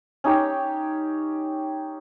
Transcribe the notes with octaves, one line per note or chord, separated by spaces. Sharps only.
C#4 D#4 G4 G5